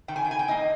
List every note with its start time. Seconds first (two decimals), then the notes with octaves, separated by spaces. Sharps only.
0.08 D#3 G5
0.16 G#5
0.25 G5
0.31 G#5
0.39 G5
0.48 A#3 D#4 D#5